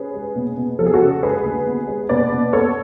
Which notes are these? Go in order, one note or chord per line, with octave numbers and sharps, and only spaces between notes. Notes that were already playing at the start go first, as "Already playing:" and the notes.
Already playing: C#4 G#4 B4
G#3
B2
B2
F3 A4
G#4
F#4 A4
C#3
G#3 G#4 B4
D2
B3
G#3
B2 B4 D5
B2
B3 A4 C#5